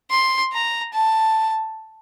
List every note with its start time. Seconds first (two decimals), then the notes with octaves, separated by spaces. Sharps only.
0.11 C6
0.53 A#5
0.93 A5